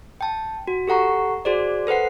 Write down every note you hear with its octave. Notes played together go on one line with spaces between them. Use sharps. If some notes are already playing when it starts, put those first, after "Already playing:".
G5 A5
F#4
G4 A4 F#5 A#5 C#6
F#4 G#4 C5 D5
A4 B4 C5 F#5 C7